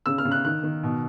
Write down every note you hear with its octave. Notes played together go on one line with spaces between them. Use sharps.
C#3 E6
F6
C#3
F#6
D#3 F#6
D#3
B2